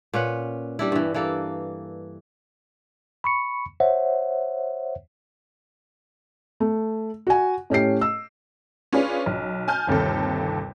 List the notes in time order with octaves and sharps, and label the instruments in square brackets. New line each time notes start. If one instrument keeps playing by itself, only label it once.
[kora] A#2 C#4 B4 F#5
G3 D4 E4
G2 E3
E3 A#3 A4
[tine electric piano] B5 C#6 C#7
C5 C#5 E5 F#5
[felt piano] A3
F#4 G#5
A2 C#4 G4 C7
E6
[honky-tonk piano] C#4 D4 F4 G#4 B4
B1
G#5 A5 F6 G6
G1 D#2 C3 A4